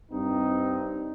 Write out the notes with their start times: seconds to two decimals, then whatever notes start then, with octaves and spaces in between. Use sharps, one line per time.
0.12 G2 C4 D#4